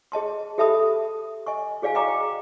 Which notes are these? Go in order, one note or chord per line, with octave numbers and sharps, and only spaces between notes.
G#4 D#5 A5 C6
G4 A4 E5 A5 B5 D#6
D#5 G#5 C#6
F#4 G#4 D5 F5 G#5
D#5 F5 G5 A#5 C#6 D6
G5